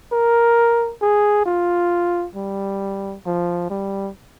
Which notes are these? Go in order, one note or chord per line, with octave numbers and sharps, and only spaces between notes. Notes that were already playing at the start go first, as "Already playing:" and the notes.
A#4
G#4
F4
G3
F3
G3